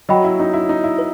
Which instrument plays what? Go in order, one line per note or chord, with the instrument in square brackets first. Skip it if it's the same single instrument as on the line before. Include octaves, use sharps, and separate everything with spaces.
[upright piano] F#3 F#4 [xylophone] D#5 G5 B5
[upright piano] E4
D#4
E4
D#4
E4
[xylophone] B4